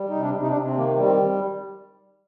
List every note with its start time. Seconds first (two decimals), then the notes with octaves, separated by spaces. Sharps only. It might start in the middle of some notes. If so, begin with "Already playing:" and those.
Already playing: G3
0.10 D#4
0.15 C3
0.22 D4
0.36 C3
0.42 D#4
0.49 D4
0.56 C3
0.66 C4
0.76 D#3 A#3
0.97 G3
1.03 C4